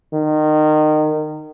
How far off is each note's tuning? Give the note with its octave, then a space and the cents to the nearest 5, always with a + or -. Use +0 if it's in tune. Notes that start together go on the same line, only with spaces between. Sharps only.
D#3 -25